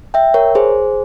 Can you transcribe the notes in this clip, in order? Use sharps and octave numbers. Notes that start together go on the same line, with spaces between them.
E5 G5
A#4 C#5
G#4 C5